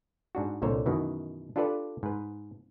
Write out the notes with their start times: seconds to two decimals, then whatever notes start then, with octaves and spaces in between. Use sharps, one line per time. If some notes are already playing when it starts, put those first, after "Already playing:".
0.35 G#2 D4 F#4
0.62 C2 A#2 D3 C5 C#5 A#5
0.86 F#2 B2 D#3 E3
1.56 D4 F4 G4 A4 B4 D5
2.03 G#2 B4